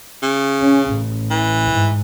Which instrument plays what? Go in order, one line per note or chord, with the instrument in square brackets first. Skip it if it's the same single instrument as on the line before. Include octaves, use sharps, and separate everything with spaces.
[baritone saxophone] C#3
[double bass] C#4
A1
[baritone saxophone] E3
[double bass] G#2